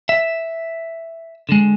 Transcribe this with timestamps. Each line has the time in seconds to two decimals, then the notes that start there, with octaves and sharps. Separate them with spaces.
0.09 E5
1.49 D3 G#3